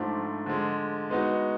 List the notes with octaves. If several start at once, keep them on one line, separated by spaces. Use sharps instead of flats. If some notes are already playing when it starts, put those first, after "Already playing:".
Already playing: G#2 F3 A3 D4
D3 F3 G#3
G#3 B3 D#4 F#4